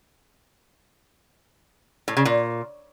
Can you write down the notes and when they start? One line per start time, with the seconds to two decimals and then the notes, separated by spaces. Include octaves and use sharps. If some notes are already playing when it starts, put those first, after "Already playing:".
2.08 A2
2.17 C#3
2.25 A#2